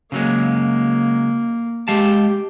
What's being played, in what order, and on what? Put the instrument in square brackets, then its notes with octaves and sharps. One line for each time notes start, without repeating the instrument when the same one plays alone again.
[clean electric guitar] C#3 F#3 G#3 [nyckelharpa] A#3
[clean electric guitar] G#3 F5 A5 [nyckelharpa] G4